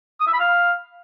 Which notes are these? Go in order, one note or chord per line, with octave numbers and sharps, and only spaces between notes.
D#6
E5
B5
F5